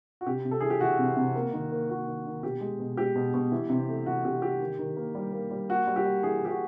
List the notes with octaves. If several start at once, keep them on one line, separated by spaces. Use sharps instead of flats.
F#4
C3 G4
C3
A4
E3 G#4
G4
E3 F#4
C3
C3
A#3
D#3
A#3
A#3 F#4
D#3
D#3
B2 G4
G#3
B2
G#3 G4
B2
B2
E3
C3
A3
E3 F#4
C3 G4
A3 G4
D#3
D#3
A#3
G3
A#3
G3
A#3 F#4
G3
G4
G3
E3 G#4
E3 G4
F#4